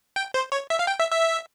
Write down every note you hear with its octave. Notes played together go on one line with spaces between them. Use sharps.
G5
C5
C#5
E5
F5
G5
E5
E5